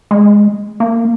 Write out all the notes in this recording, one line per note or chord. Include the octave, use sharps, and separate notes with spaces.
G#3
A#3